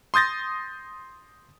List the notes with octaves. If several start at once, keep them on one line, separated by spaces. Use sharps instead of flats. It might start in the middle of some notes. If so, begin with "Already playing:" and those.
C6 D#6 G6 A6 A#6